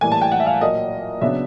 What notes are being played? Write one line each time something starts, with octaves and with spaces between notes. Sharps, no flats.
A2 E3 G3 A#3 G#5
A5
G5
F#5
E5
F5
A#2 F#3 A#3 D#5
C#3 F#3 B3 D4 E5